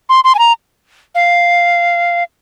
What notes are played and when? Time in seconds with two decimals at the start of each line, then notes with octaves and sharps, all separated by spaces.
0.09 C6
0.24 C6
0.35 G#5
0.39 A#5
1.15 F5